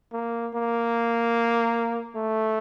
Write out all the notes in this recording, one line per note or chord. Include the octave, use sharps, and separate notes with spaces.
A#3
A#3
A3